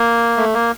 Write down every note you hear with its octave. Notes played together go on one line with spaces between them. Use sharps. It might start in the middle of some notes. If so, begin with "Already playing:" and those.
Already playing: A#3
A3
A#3